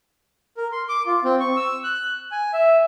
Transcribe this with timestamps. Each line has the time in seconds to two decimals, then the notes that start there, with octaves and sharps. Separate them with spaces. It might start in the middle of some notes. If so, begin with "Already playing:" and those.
0.57 A#4
0.72 C6
0.89 D6
1.06 F4
1.24 C4
1.40 C#6
1.56 E6
1.84 F#6
2.32 G#5
2.53 E5